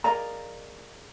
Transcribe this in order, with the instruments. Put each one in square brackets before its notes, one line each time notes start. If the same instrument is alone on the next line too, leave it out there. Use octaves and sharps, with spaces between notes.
[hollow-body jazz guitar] G#4 A#4 D5 D#5 F5 A#5